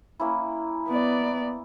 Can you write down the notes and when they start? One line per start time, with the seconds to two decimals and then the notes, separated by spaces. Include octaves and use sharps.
0.20 A#3 C#4 E4
0.89 B3 D5